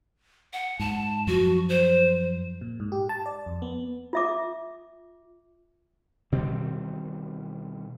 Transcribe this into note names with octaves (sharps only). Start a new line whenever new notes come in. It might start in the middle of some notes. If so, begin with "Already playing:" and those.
F#5
G#2 A5
F#2 F3 F#4
C5
A#2
G#2
G4
A5
D5
F2
B3
F4 E5 D6
B2 D#3 G3 C4